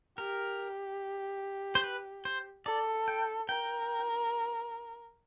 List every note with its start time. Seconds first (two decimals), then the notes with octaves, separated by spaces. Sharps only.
0.18 G4 A#4
1.75 C5
1.84 B4
2.25 C5
2.66 A4 D5
3.08 G5
3.49 A#4 G5